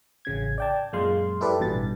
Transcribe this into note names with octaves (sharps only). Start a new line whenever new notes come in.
A1 C#3 G#6
D5 G5 A5
F#2 A#2 G#3 F5 C6
E4 G4 A4 B4 D5
A1 G2 B2 A6